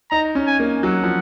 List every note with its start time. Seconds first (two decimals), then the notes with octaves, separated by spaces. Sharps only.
0.11 D#4 A#5
0.35 C#4
0.47 G#5
0.60 A#3
0.83 F#3 F#5
1.03 F3